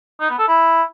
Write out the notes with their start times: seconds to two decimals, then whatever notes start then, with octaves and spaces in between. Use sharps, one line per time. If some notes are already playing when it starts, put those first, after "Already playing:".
0.20 D#4
0.29 B3
0.39 A4
0.48 E4